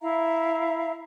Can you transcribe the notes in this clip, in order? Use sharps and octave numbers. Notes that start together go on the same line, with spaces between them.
E4 E5 F5 A#5